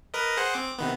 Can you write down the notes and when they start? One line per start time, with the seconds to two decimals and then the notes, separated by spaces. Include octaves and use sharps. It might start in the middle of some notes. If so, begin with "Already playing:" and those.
0.14 A#4 B4 D#5
0.37 G#4 C5 F#5
0.54 C4 D6
0.78 C3 D#3 B3